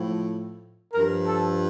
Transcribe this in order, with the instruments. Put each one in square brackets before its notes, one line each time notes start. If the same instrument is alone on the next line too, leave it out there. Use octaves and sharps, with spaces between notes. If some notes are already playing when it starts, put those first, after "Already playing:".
Already playing: [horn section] A2 F3
G2 F3 A#4
A4